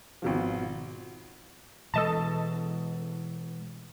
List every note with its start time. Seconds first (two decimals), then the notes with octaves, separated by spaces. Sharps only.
0.22 G#1 B2 F3
1.94 B2 E3 G#3 A4 D#5 A5